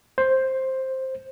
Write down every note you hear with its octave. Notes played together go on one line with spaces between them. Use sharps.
C5